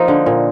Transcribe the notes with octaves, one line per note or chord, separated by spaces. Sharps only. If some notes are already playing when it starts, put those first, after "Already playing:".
Already playing: F3 A#3 D#4
D3
A#2